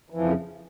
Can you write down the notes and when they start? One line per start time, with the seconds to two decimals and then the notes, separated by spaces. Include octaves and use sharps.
0.10 E3
0.14 F3
0.17 F2
0.21 C#3